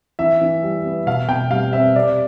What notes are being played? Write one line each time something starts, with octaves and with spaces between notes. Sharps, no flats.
E3 E5
E3
G3
B3
B2 F5
B2 G5
G3 F5
C4 E5
C3 D5